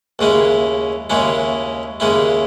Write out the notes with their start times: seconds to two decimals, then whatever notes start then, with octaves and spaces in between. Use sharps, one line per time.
0.19 D#2 C#3 G#3 C#4 E4
1.10 D#2 C#3 G#3 C#4 E4
2.00 D#2 C#3 G#3 C#4 E4